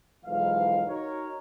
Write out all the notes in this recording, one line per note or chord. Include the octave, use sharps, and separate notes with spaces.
B1 G#2 E3 F3 F5
D#4 F#4 A#4 C#5